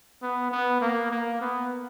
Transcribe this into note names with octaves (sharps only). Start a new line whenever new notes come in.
B3
B3
A#3
A#3
B3